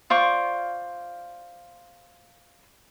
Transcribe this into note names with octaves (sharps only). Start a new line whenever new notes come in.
F4 C5 D5 C#6